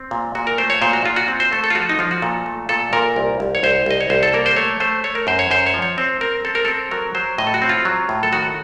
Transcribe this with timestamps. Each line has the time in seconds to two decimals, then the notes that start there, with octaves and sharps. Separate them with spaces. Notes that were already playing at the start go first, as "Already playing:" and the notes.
Already playing: C4
0.11 A#2
0.35 A#2 F#4
0.47 A#4
0.58 A3 C5
0.70 C#5
0.82 A#2 C5
0.93 F#4
1.06 A#2 F4
1.16 F#4
1.28 C4
1.40 C5
1.52 A3 A4
1.64 A4
1.70 F4
1.75 F3 F#4
1.89 D#4
1.99 F3 F4
2.11 F#4
2.22 A#2 A4
2.46 A3
2.69 A#2 A4
2.93 A#2 A#4
3.16 C2
3.40 C2
3.55 C#5
3.63 C2 C5
3.86 C2 D#5
4.01 C#5
4.10 C2 C5
4.23 A4
4.33 A#3 A#4
4.46 C5
4.56 A3 C#5
4.80 A3 C5
5.04 A3 C#5
5.15 A#4
5.27 F#2 C5
5.39 C#5
5.51 F#2 C5
5.67 C#5
5.74 F3
5.82 C#5
5.98 C4 C5
6.21 C4 A#4
6.45 C4 A4
6.55 A#4
6.65 C4 A4
6.91 F#3 A#4
7.15 F#3 C5
7.38 A2 D#5
7.47 A4
7.54 F#4
7.62 C4
7.69 F4
7.85 F#3
8.09 A2
8.23 A4
8.32 D#3 F#4